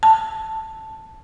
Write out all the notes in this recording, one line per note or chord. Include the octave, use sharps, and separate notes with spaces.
A5